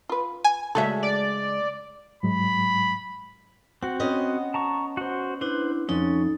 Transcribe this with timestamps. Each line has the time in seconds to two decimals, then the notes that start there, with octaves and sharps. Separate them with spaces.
0.09 F4 B4
0.44 G#5
0.75 C#3 G#3 F#4 A4 E5
1.03 D5
2.23 G#2 F#3 G#3 B5
3.83 C4 F#4 F#5
4.00 B3 C#4 D#5
4.54 A5 A#5 C#6
4.97 F#4 C5
5.41 D4 E4 B4 C5
5.89 F2 C#4 D#4 A4